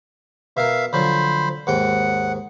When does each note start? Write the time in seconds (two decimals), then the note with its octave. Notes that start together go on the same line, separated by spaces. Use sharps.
0.57 B2 A#4 E5 F5
0.93 D3 F3 F#3 C5 B5
1.67 D#2 G#2 F#5 G5